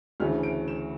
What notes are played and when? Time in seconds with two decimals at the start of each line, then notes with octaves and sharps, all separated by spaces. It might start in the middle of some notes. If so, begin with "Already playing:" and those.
0.20 D2 C#3 E3 A3 F6
0.43 D7
0.68 E7